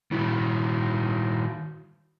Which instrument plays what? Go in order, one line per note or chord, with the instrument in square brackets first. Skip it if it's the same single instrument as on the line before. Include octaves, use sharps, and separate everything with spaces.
[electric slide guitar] D#3 E4 F#4